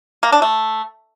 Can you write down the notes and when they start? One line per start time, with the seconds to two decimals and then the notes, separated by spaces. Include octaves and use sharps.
0.23 A#3
0.32 D4
0.42 A3